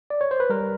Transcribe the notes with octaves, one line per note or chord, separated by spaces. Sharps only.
D5
C#5
C5
B4
G3 A#4